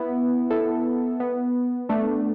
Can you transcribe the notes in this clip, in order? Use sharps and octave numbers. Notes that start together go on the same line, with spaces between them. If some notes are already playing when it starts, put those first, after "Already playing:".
Already playing: B3 E4
E4 A4
B3
A3 D4